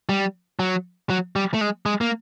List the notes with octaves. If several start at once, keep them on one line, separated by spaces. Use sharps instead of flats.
G3
F#3
F#3
G3
A3
G#3
G#3
A#3